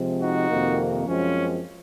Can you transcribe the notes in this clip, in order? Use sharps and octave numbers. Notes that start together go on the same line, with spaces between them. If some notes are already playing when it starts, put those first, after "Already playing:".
Already playing: C3 F3 G#3 C4
D#4 F#4
F2 C3 D#3 A#3
F#2 F3 G#3 C4 C#4